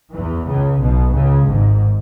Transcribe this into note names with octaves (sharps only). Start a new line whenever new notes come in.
E2 E3
C#2 C#3
B1 B2
C#2 C#3
G#1 G#2